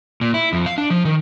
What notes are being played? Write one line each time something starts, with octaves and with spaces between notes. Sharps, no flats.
A#2
E4
F2
F5
D4
F3
D#3